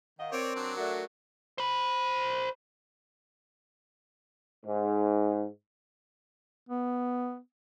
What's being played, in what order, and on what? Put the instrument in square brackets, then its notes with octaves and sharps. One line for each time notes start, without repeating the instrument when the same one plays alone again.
[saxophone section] D#3 D#5 [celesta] F5 F#5
[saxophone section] C4 [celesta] A#4 D7 [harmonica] C#5 D5
[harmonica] F#3 D4
[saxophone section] A3 F#4 [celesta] A#4 D5
[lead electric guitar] C5 B5
[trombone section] G#2
[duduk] B3